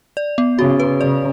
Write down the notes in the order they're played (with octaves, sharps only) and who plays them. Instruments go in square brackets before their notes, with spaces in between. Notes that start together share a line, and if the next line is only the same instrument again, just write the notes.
[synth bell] D5
B3
[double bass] C#3 [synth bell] F#4
[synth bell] B4
[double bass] C#3 [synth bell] D5